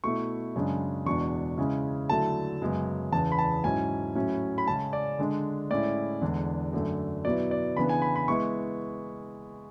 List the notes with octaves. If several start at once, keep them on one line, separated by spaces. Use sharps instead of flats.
B2 A3 E4 C#6
F#2 C#3 G#3 D4
E2 B2 G#3 D4 C#6
C#3 G#3 C#4 E4
D3 F#3 A3 E4 A5
F#2 C#3 G#3 B3
E2 C#3 E3 B3 A5
B5
A5
G#2 F#3 C#4 E4 G#5
A2 F#3 C#4 E4
B5
C#3 G#3 C#4 A5
D5
D3 G#3 D4
A2 G#3 C#4 E4 D5
E2 D3 G#3 D4
F#2 D3 A3
B2 F#3 B3 E4 D5
D5
C#3 E3 B3 D4 B5
G#5
B5
B5
G#3 B3 E4 C#6